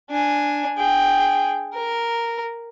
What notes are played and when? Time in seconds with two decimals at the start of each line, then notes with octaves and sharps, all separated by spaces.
0.10 D4 G#5
0.77 G#4 G5
1.74 A#4